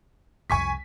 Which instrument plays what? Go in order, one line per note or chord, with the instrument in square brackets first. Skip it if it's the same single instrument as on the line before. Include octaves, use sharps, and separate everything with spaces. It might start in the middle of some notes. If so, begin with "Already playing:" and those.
[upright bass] C2 F2 [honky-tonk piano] G#5 C#6 B6